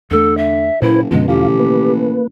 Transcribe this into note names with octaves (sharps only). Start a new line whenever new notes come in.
E2 D3 A3 A4
E5
F#1 A#2 E4 B4 C5
C#2 F#2 B2 D3 F3 G#3 B3
A1 E2 F4 G4 F5
A#3 B4